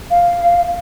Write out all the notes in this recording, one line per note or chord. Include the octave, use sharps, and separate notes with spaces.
F5